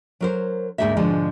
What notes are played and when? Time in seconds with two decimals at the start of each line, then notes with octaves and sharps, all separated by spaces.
0.21 F#3 A#4 C5
0.78 D2 G#2 G#3 A#3 D#4 E5
0.97 G#2 B2 D3 F3 G#3